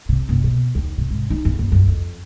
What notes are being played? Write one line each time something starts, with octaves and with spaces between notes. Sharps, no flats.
C3
F#1
B2
D#2
C3
G#1
D#4
E2
F#1
F#2
F2